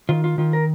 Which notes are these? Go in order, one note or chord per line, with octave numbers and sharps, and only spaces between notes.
D#3 F4
F4
D#3 F4
A#4